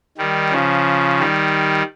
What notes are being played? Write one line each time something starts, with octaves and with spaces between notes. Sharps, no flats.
D#3 G3
C#3 F3
D#3 G3